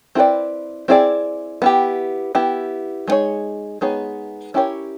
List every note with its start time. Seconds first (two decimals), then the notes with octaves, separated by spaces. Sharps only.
0.15 C4 E4 G#4 B4 D5
0.88 C4 E4 G#4 B4 D5
1.62 B3 E4 G4
2.35 B3 E4 G4
3.08 G#3 B3 D#4 G#4 C#5
3.81 G#3 B3 D#4 G#4 C#5
4.54 C#4 E4 G4 A#4 C#5